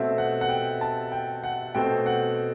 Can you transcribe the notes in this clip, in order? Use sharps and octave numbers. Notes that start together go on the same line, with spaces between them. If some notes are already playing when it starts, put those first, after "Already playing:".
Already playing: B2 A3 C4 E5
F#5
F#5
G5
A5
G5
F#5
B2 A3 C4 G5
F#5